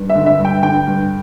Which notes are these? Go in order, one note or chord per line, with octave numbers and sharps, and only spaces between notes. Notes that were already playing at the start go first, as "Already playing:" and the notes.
Already playing: G2
E5
D3
E5
G2
G5
D3 G5
G2